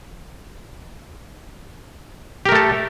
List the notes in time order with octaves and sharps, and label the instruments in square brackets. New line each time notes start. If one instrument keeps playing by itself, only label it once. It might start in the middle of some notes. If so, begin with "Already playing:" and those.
[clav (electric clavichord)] G4
A#4
A3
A4